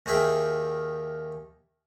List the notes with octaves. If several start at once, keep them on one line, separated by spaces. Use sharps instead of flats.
D#2 D#3 G#4 E5 G5